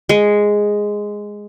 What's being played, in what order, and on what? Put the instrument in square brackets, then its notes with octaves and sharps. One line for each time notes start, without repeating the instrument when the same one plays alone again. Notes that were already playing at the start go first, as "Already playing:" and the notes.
[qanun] G#3